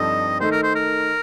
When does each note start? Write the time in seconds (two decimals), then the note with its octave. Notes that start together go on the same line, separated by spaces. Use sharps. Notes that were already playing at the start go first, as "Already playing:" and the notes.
Already playing: G2 F3 C4 D#4 A4 D#5
0.40 D#3 A3 D#4 A4 C5
0.52 A#4
0.63 C5
0.75 A#4